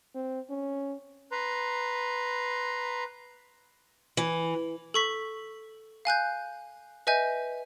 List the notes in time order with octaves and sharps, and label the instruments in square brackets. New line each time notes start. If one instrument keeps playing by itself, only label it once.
[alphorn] C4
C#4
[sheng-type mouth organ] B4 A#5 C6
[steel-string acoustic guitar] E3
[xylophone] A4 C#6 B6
F5 G#5 F#6 G6
B4 D#5 E5 G#5 G6